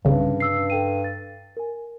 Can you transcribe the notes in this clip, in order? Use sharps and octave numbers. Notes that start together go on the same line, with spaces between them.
C2 G2 C#3
E6 C7
A4 G5 D#7
A6
A#4 G#5